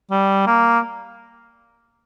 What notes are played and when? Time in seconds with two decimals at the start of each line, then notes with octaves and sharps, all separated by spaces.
0.11 G3
0.47 A#3